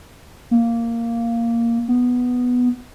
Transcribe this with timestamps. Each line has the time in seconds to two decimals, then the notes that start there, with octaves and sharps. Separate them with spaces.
0.51 A#3
1.88 B3